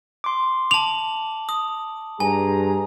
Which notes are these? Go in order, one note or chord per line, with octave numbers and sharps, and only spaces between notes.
C6 D6
A5 D6 F7 F#7
D#6
G2 G#4 G#5 A#5